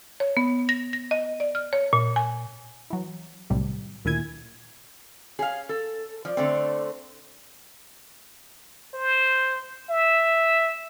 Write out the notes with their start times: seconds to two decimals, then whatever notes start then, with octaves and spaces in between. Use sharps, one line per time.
0.20 C#5
0.37 B3
0.69 A#6
0.93 A#6
1.11 D#5
1.40 D5
1.55 F6
1.73 C#5
1.93 A#2
2.16 G#5
2.90 E3 F#3
3.50 B1 A2 C3 D#3 G3
4.05 D2 A#2 D#3 E4 G#5 G#6
5.39 C#4 G#4 F5
5.69 A4
6.25 F3 D5
6.37 D3 A3 C4
8.94 C5
9.90 E5